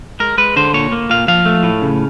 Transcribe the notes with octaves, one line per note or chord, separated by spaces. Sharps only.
G#3 A#4
G#3 B4
D3 C5
A#2 C#5
A#3
A#2 F5
F3 F5
A3
A2
C#3